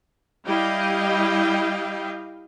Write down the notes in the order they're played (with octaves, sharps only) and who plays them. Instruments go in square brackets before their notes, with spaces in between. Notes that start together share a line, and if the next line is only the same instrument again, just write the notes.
[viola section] G3 E4 D#5 F5 G5